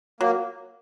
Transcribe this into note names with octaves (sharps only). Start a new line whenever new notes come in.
F#3 A#3